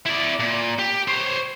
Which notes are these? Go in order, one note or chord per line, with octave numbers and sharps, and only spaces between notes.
E4 D5
A#2
G4
C5 C#5